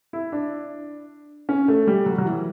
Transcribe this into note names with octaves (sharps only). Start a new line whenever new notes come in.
E4
D4
C#4
A3
G3
F#3
F#3
E3